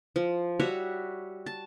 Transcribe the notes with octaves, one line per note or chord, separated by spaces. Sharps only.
F3
G3 F#4 C#5 E5
A5